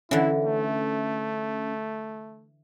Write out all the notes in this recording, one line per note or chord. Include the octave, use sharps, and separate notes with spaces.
D3 E3 C#4 E4
A3